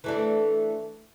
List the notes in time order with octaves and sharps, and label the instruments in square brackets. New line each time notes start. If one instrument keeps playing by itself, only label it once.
[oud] E3 A3 D4